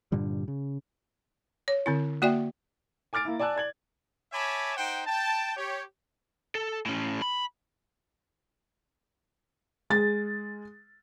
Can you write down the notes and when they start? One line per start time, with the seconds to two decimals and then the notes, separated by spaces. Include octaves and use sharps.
0.12 G2 A#2 D3 G3
0.48 C#3
1.68 C#5
1.86 D3 C4 E4
2.22 A#3 F#4 D5 E5 G5
3.13 G#5 D6 F6 A6 D7
3.25 A#3 E4
3.40 D5 G#5 A5 E6 F#6
3.56 D5 G#6 F#7
4.33 C#5 E5 G#5 A5 B5 D6
4.76 D#4 C5 F#5 G5
5.07 G5 A5
5.56 G4 C#5
6.55 A4
6.86 A2 C#4
7.22 B5
9.90 G#3 A6